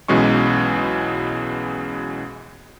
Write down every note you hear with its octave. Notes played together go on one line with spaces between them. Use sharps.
B1 B2 E3 G#3 C#4 C#6